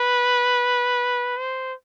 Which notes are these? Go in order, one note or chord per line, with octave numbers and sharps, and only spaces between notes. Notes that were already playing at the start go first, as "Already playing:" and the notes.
Already playing: B4
C5